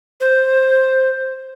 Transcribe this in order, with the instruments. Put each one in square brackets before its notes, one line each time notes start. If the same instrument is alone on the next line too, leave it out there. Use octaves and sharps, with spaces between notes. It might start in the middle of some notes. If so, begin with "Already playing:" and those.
[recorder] C5